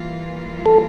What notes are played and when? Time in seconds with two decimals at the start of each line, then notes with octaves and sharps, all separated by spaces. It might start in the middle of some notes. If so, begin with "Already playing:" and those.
Already playing: E3 G3 A#3 F4
0.66 A4